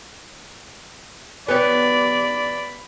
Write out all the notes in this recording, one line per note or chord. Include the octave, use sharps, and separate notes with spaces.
B3 G4 C#5 D5 B5